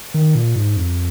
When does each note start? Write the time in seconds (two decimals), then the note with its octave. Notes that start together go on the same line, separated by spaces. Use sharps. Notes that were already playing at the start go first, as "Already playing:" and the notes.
0.14 D#3
0.35 A#2
0.56 G#2
0.77 F2